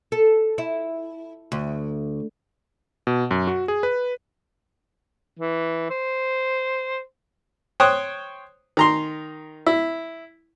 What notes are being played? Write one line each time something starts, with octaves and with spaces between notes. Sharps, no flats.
A4
E4
D2
B2
F#2
F#4
G#4
B4
E3
C5
C5 C#5 G5 D#6 F#6
D#3 A#5 C6
E4